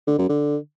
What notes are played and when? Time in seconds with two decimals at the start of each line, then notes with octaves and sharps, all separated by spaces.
0.07 D3
0.18 F#2
0.29 D3